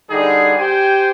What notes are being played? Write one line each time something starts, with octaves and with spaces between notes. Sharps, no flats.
D3 G3 D#4 G#4
G4 C5 G5 G#5